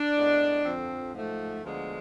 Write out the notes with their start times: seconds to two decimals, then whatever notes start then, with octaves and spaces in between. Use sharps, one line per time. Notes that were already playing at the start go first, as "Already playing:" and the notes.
Already playing: D4
0.16 A2 G#3 B3
0.65 F2 D3 F3 C4
1.14 G#2 F3 A3
1.63 D2 D3 F3 G#3 B3